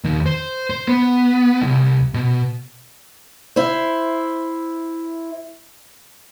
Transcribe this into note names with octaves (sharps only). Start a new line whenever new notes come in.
D#2
C5
C5
B3
C2
B2
E4 C5